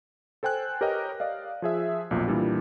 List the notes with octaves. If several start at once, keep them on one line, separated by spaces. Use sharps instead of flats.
A4 C5 G5 G#5 F#6
G4 A#4 B4 C#5 D#5 G5
D5 D#5 F5
F3 G#4 E5
B1 F2 A#2
A#2 E3 G3 D4